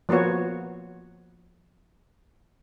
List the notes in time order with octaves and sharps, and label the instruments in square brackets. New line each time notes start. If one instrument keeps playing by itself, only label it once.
[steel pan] F3 A#3 B3 F#4 C#5